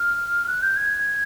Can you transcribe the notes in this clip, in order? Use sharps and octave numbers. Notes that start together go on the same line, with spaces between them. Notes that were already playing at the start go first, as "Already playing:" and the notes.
Already playing: F6
F#6
G6
G#6